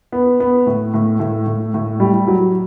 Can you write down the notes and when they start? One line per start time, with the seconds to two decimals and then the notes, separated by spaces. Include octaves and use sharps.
0.12 B3
0.40 B3
0.66 A2
0.94 A2
1.20 A2
1.47 A2
1.74 A2
2.00 G3
2.27 F#3